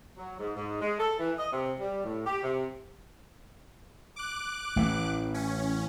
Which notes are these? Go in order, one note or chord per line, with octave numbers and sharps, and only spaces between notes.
F#3
G#2
G#2
G#3
A4
E3
D#5
C3
G3
A2
G4
C3
D6 F#6
A1 E3 A3
C#4